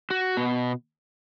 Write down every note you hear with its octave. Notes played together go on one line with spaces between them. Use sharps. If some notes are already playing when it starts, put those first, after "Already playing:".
F#4
B2